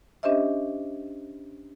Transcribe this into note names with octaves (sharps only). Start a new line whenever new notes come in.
C#4 D4 G4 C5 D#5 E5